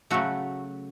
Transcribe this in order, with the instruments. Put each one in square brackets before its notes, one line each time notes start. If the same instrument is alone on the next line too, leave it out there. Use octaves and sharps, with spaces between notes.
[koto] C#3 F#3 A3 F#4